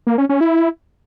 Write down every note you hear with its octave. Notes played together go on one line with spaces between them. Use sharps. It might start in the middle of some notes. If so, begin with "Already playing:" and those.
A#3
C#4
C#4
E4